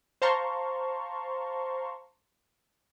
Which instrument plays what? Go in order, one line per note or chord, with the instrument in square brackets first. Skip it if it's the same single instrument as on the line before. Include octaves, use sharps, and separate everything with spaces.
[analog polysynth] C5 F5 A5 A#5 C6 C#6